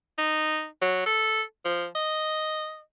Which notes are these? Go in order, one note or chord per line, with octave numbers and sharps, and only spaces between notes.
D#4
F#3
A4
F3
D#5